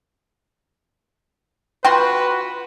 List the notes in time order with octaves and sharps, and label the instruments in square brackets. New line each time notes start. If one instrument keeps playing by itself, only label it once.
[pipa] F4 C6 [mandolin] F#4 [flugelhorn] B4 [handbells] G5